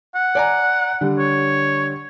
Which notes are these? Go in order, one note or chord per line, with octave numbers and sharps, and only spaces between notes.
F#5
D5 G#5 A#5
D3 G3
C#5